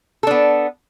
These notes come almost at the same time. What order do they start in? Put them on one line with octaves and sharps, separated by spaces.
A4 D4 B3